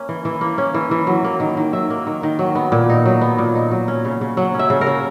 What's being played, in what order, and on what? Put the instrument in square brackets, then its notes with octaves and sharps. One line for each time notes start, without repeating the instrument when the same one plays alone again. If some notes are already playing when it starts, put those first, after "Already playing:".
Already playing: [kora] A#3 C#4
E3
E3
A#3
C#4
E3
E3
F#3
A#3
D#3
D#3
F#3 E5
A#3
D#3
D#3
F#3
B3
A#2
D#4
F#3
B3
A#2
D#4
F#3
C#4
C#3
C#3
F#3 F#5
C#4 E5
C#3
A#4
C#3